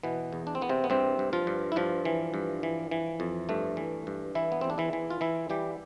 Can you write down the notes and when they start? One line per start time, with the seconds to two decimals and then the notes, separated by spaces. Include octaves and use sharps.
0.03 B2 E3 B3
0.33 E2
0.47 D4
0.55 C4
0.61 E2 B3
0.69 C3 C4
0.84 B3
0.90 G2 C3 C4
1.19 G2
1.33 F3 F4
1.47 G2
1.72 E4
1.76 G2 F3 F4
2.05 E3
2.34 G2
2.63 E3
2.91 E3
3.20 F2
3.49 G2 A3
3.77 E3
4.07 G2
4.35 E3 E4
4.52 B3
4.61 E2 C4
4.70 D4
4.78 E3 E4
4.93 E3
5.10 F4
5.21 E3 E4
5.50 E3 G3 G4